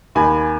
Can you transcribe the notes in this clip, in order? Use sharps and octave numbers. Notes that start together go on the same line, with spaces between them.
D#2 G#5 B5